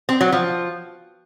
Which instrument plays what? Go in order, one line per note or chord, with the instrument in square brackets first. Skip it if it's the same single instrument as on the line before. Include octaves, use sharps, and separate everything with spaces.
[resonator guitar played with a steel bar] C4
F#3
F3